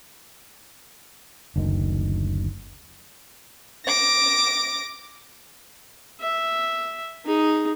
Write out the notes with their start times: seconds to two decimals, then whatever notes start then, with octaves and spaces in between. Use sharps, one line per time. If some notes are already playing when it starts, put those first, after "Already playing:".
1.56 F#1 D2 D#3
3.85 D6 A#6
6.20 E5
7.25 D#4 G#4